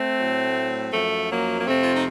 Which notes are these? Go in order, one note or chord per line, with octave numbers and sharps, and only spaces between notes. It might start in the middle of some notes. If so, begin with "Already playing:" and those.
Already playing: A3 C4
A2 F#3
F#2 F3 A3
F#3 A#3
A#3
F2 C3 F3 A3 C4
F4
D#4